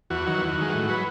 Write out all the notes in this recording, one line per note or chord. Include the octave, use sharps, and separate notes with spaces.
E2 F#4
D#3 F#3
E2
D#3 G#3
A2
F#3 B4